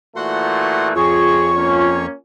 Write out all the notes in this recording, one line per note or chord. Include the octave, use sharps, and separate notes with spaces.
A#2 E3 A3 F#4 F#5 C6 F#6
F2 F4 G#4 C#5 C#6
A#3 C#4